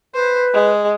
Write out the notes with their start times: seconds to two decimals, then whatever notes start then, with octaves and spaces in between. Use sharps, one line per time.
0.14 B4 C5
0.54 G#3